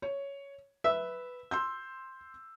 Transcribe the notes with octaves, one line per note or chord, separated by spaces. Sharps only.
C#5
B4 E5
C6 E6 G6